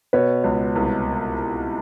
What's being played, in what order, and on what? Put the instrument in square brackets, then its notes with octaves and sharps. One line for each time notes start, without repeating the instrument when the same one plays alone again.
[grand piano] B2 [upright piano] B4 C#5
[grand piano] C#2
C2